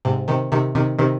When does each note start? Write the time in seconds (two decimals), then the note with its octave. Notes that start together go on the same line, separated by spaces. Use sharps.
0.05 G#2 C3
0.28 C3 D#3
0.52 C3 D#3
0.75 C3 D#3
0.99 C3 D#3